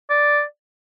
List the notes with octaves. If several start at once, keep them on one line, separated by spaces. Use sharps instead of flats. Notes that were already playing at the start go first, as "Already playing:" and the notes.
D5